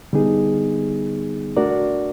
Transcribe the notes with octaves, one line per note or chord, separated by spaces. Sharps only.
D3 G3 B3 D#4 G#4
A3 D4 F#4 A#4 D5